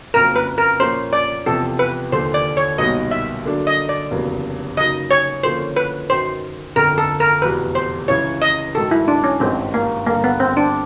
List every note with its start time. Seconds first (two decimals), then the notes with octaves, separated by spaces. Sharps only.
0.14 F#1 F2 C#3 F#3 A#3 A#4
0.36 B4
0.58 A#4
0.80 A#2 F3 A#3 C#4 C5
1.13 D5
1.46 E2 C3 F3 A4
1.79 B4
2.12 D#2 D3 F3 C5
2.34 D5
2.57 C#5
2.78 B1 A#2 G3 B3 D#4 D#5
3.11 E5
3.45 D3 F#3 A#3 D4
3.67 D#5
3.89 D5
4.11 F1 E2 C#3 F#3 A#3
4.77 F#2 C#3 F#3 A#3 D#4 D#5
5.11 C#5
5.44 D3 F3 A#3 C#4 C5
5.77 B4
6.09 F#2 D#3 F#3 C5
6.76 G1 F2 D3 A#4
6.98 A4
7.20 A#4
7.42 F1 E2 B2 B4
7.75 C5
8.08 C#2 C#3 E3 C#5
8.42 D#5
8.74 G#2 D#3 F#3 A4
8.91 E4
9.08 D4
9.24 C#4
9.40 G#1 G2 D#3 G#3 C4
9.74 A#3
10.07 G2 D3 G3 A#3
10.24 B3
10.40 C4
10.57 D4